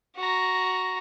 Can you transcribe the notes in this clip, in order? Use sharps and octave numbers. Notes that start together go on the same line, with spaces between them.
F#4 A#5